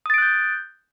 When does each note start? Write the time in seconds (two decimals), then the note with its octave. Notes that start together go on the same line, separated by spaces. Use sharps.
0.06 D#6
0.10 A6
0.14 D7
0.18 F#6
0.22 G6